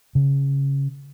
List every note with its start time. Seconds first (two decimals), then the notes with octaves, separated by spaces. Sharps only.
0.15 C#3